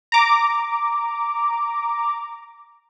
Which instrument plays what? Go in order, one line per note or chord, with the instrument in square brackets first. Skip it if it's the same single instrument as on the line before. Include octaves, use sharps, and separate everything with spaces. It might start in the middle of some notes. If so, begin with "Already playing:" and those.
[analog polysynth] A#5 D6